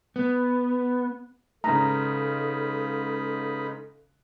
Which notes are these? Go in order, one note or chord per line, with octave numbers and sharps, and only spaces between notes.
B3
G#2 C#3 D#4 A4 B4 A#5